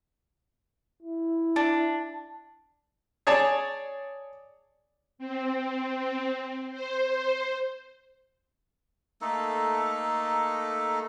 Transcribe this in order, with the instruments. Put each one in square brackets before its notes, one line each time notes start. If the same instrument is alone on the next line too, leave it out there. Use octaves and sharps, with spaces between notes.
[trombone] E4
[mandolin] D4
[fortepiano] G#4 C#5 D5 A5
[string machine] C4
C5
[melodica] A3 A#3 D#4 A4